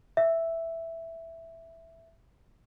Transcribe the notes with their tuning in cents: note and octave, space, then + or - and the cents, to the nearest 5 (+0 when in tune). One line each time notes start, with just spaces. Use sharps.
E5 +0